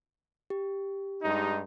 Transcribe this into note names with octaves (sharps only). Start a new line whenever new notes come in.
G4
G2 G#3 D#4